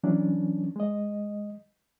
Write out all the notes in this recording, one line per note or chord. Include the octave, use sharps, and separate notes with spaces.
E3 F#3 C#4 D4
G#3 D#5